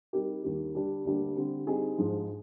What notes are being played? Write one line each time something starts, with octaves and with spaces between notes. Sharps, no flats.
G3 C4 D#4 G4 A#4
D#2 D#3 G3
D3 G3 D4
D2 D3 G3 A#3 D4
D3 G3 C4
G3 C4 D#4 G#4
G#2 F3 G#3